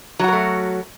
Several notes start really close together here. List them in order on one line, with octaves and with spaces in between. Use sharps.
F#3 F#4 A#4 A3